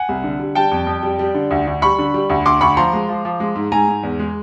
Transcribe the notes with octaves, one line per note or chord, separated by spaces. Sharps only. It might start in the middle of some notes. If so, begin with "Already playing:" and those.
Already playing: F#5 G#5
C2
D3
G3
G3 G5 A5
F2
F2
G3
G3
D3
D2
D2
G3 B5 C#6
D3
G3
D2
D2 C6 D6
D2 B5 C#6
F3 A#5 C6
G#3
F3
F3
G#3
G#2
G#2 G#5 A#5
G#2
E2
G#3